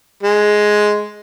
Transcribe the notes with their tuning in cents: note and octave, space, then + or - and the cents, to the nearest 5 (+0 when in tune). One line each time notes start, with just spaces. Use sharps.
G#3 +5